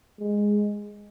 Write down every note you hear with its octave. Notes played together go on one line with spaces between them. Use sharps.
G#3